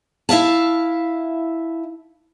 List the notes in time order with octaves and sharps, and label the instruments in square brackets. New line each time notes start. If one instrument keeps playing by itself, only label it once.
[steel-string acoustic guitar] E4 E5 F5 A5